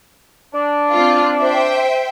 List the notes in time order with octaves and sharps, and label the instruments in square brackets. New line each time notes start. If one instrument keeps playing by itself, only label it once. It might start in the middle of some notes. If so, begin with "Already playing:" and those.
[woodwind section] D4
[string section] C4 F4
C5 E5 G5